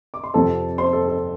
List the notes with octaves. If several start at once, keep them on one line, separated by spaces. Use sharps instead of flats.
D6
C6
F2 C3 F3 C4 A4 A5
C5 C6
A4
A4